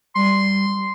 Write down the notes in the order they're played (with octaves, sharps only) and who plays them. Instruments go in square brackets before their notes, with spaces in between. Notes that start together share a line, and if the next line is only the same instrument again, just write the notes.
[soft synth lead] G3 [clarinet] C6